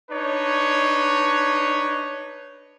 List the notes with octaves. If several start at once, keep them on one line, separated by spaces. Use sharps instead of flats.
D4 D#4 B4 C#5